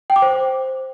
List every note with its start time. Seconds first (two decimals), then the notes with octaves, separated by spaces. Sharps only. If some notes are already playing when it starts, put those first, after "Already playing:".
0.10 G5
0.16 D6
0.22 C5